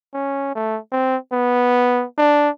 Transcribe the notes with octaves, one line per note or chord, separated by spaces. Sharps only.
C#4
A3
C4
B3
D4